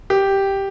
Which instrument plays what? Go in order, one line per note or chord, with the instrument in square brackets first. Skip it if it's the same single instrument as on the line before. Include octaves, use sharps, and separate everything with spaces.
[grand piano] G4